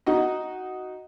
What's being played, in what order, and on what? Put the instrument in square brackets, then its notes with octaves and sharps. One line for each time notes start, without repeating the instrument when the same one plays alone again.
[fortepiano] D#4 F#4 D#5